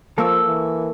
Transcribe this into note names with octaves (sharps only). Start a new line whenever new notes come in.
F3 A#3 A4 C#6 E6
E3